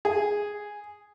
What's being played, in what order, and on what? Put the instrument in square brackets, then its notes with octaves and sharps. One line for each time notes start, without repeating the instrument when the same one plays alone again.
[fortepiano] G#4